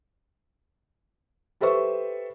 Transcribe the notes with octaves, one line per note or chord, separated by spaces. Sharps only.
G4 A4 B4 C5 E5 C#6